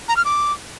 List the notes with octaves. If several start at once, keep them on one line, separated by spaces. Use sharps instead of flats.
A#5
F6
D6